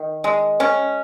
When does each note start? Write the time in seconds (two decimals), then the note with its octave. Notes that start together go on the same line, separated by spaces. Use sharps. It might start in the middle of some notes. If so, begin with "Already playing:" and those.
Already playing: D#3
0.24 G#3
0.60 C#4